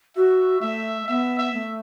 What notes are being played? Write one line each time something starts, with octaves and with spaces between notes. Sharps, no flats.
F#4 E5
A3 E5
B3 E5
E5
A3